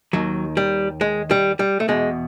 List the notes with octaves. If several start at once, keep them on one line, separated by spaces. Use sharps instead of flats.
D#2 D#3 F#3
G3
G#3
G3
G3
A3
E2 B2 G#3